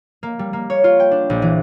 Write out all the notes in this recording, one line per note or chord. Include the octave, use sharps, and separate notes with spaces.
A#3
G3
A#3
C#5
F4
G5
D4
A#1
E3